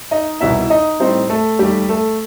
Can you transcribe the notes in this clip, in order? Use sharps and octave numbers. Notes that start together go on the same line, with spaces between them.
D#4 D#5
C2 B2 G3 B3 D#4 E4 E5
D#4 D#5
A2 G3 C4 D#4 C5
A3 A4
D#2 D#3 G3 A3 G4
A3 A4